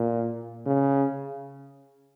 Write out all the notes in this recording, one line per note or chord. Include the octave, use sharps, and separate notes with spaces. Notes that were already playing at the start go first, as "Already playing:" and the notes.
Already playing: A#2
C#3